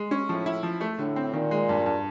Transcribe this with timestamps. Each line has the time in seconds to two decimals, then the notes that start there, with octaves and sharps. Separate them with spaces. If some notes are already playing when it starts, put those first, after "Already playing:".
Already playing: G#3
0.11 C#4
0.29 A2 F3
0.46 E4
0.63 F3
0.81 A3
0.98 A2 D3
1.16 C4
1.33 A#2 D#3
1.51 G#3
1.69 G2
1.86 G2